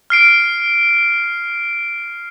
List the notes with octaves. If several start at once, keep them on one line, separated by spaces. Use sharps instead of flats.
F6 C7 D7